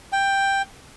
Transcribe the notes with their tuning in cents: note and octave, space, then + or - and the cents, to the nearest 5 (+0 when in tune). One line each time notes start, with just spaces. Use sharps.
G5 +5